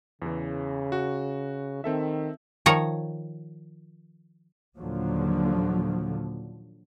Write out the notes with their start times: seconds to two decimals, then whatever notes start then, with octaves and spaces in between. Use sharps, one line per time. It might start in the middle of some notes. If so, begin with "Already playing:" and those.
0.22 E2 C#3 E3
0.92 F#4
1.84 D#3 C4 A4 E5
2.66 D#3 F3 C#5 A#5
4.78 D#2 A#2 D3 F3 F#3